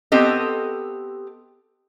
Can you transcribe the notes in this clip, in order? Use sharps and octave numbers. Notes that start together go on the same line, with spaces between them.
B3 C4 G4 A4 D#5